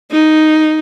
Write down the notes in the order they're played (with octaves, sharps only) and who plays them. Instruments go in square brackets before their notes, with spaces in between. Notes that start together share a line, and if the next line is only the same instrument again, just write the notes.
[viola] D#4